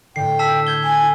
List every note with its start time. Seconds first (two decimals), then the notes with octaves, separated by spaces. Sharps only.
0.16 A2 D3 G5 C7
0.39 A5 E6 B6
0.67 G6 G#6 G7
0.84 G#5